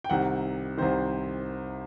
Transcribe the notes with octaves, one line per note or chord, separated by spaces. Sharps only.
G5
C2 C3 D#3 F#5
C2 C3 D#3 C5